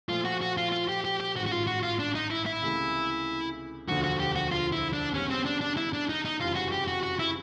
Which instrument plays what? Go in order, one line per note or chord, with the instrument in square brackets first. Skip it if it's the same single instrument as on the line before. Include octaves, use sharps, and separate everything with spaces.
[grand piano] A#2 F3 A3 [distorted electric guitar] F4
[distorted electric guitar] F#4
F#4
F4
F4
G4
G4
G4
[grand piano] A1 G#2 D#3 [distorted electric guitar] F#4
[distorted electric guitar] F#4
F4
F#4
F4
D4
D#4
E4
E4
[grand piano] C#2 C3 E3 A3
[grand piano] E1 D2 D3 F3 A#3 [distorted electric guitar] F#4
[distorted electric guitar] F#4
G4
F#4
F4
E4
D4
[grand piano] F#1 F#2 D#3 G3 B3 [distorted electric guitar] C#4
[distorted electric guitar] C4
D4
D4
E4
D4
D#4
D#4
[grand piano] F#1 F2 C3 E3 G3 [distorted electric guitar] F4
[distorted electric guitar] F#4
G4
F#4
F#4
E4